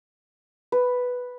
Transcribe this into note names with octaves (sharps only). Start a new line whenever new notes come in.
B4